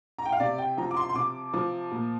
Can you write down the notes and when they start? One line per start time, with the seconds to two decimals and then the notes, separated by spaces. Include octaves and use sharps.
0.18 A#5
0.25 G5
0.32 F5
0.40 C3 D5
0.58 G5
0.77 F3 A#5
0.91 D6
0.97 C6
1.09 C6
1.15 C3 D6
1.53 F3
1.91 A#2